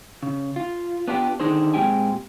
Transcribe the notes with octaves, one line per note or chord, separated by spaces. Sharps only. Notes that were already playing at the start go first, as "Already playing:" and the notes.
C#3
F4
B3 D4 F4 G4
D3 D#3 D4 D#4 G#4 C5
A#2 G#3 C4 G4 G5 G#5